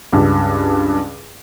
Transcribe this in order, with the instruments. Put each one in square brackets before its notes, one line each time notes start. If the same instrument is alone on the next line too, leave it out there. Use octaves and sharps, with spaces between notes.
[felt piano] C#2 G2